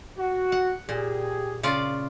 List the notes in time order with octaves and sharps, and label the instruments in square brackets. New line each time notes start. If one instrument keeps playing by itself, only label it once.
[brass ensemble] F#4
[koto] F#5
[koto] A#2 [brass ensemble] G4 G#4
[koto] C#3 F4 D5